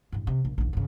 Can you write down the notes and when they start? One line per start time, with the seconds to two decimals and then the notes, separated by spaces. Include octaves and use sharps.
0.12 A1 G2
0.27 C3
0.45 A#1
0.58 A#1 D#2
0.73 G1 C#3